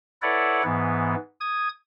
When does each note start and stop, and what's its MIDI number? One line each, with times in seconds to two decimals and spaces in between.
0.22 0.63 64
0.22 0.63 69
0.22 0.63 71
0.22 0.63 73
0.22 0.63 74
0.22 0.63 78
0.64 1.15 44
0.64 1.15 52
0.64 1.15 59
1.40 1.68 87
1.40 1.68 92